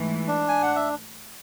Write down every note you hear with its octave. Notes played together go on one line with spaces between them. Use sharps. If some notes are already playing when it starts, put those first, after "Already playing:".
Already playing: G#2 E3 A3
D4
G#5
F#5
E5